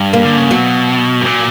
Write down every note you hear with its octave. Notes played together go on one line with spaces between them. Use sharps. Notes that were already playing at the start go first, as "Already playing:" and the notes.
Already playing: G2
A#3
D3
C#3
B2 F#3
G2
A#2